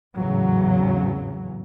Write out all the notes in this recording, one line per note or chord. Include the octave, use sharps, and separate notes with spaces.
G#1 E2 A2 C#3 F#3